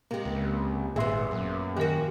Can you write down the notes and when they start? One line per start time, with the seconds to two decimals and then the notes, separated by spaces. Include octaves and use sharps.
0.11 C3 G#3 A#3 G4
0.25 C#2
0.96 G#1 A#2 B3 G#4 E5 C6
1.31 F#2
1.77 D#3 F3 F#4 G4 A#4